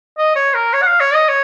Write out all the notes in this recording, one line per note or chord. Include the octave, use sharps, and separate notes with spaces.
D#5
C#5
A#4
C#5
F#5
F5
C#5
D#5
C#5